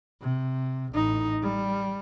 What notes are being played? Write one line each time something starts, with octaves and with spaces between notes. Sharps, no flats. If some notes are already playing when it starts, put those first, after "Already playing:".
C3
A1 D#4
G3